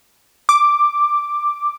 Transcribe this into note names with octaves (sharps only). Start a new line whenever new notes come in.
D6